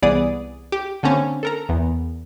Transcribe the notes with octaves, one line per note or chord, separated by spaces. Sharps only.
C2 E3 B3 G#4 D5 D#6
G4
D3 A#3 C4 C#4
A4 A#4 A#5
E2